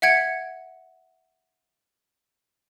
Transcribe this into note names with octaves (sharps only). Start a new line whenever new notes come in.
E5 F#5 G#6 C#7 D7